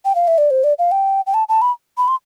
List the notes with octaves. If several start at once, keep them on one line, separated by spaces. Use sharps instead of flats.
G5
F5
E5
D5
C5
D5
F5
G5
G5
A5
A5
B5
B5
C6